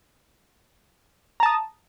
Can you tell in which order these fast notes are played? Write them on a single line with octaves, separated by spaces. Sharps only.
A#5 A5 D#6